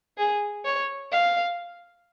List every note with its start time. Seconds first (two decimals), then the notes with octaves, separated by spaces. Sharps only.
0.17 G#4
0.65 C#5
1.12 F5